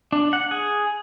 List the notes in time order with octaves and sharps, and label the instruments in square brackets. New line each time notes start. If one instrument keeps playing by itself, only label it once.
[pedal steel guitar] D4
F#5
G#4